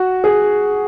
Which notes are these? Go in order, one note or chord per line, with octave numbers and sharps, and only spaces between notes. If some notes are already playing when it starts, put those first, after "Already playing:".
Already playing: F#4
G#4